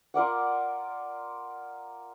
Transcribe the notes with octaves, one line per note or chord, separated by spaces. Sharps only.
F4 A#4 D5 F#5